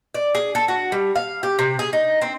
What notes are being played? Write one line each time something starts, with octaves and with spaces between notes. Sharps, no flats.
D5
G#4
A4
F#4
G3
F5
G4
C3
G#4
D#4
C4